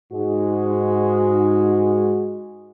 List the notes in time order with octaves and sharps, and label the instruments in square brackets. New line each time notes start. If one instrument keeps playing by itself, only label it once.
[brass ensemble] G#2 G#3 F#4